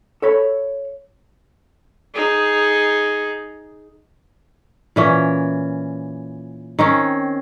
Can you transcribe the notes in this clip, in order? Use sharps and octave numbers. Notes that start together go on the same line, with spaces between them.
A4 C#5 B5
D#4 G#4
A#2 E3 C#4
D#3 C4 C#4